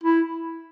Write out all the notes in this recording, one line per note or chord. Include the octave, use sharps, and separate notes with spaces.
E4